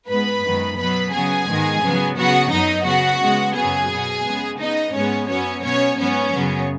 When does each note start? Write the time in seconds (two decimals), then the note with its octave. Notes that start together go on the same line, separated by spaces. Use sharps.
0.09 G#2 G#3 B3 B4 B5
0.44 F#2 D#3 G#3 B3
0.78 B2 F#3 B3 B4 B5
1.13 C#3 F#3 B3 G#4 G#5
1.48 G#2 D#3 G#3 B3
1.83 C#3 F#3 B3
2.17 C#3 F#3 B3 F#4 F#5
2.51 F#2 F#3 B3 D#4 D#5
2.86 C#3 B3 F#4 F#5
3.21 C#3 G#3 B3
3.55 F#2 C#3 F#3 B3 G#4 G#5
3.90 B2 B3
4.25 C#3 G#3 B3
4.59 C#3 B3 D#4 D#5
4.94 G#2 G#3 B3 C#4 C#5
5.28 F#2 F#3 B3 C#4 C#5
5.63 B2 B3 C#4 C#5
5.97 G#2 F#3 B3 C#4 C#5
6.33 F#2 C#3 F#3 B3